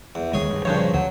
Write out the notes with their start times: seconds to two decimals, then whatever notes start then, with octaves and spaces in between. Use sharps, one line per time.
0.15 E2
0.33 D2 D#3 G#3 G#4 C#5 G#5
0.50 G2
0.65 G2 A#2 C#3 F3 D4 C5 C#5
0.94 D2 F#3